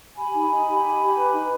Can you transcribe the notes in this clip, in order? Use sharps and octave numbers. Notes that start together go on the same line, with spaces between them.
G4 G#5 B5
D#4
D#4
G4
D#4
G4
B4
D#4